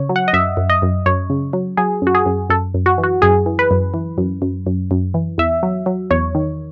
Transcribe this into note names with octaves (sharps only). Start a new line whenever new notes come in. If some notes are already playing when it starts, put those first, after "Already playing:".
Already playing: C#3 C#5
F#3
F#5
D#5
F#2 E5
F#2
D#5
F#2
F#2 C#5
C#3
F#3
F#3 G#4
F#2 F#4
G#4
F#2
F#2 A4
F#2
F#4
E3
F#4
F#2 G#4
E3
B4
F#2
E3
F#2
F#2
F#2
F#2
E3
E2 E5
F#3
F#3
E2 C#5
D#3